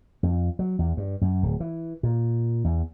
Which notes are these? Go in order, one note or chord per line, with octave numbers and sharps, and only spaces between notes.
F2
F#3
E2
G2
F#2
D1
E3
A#2
E2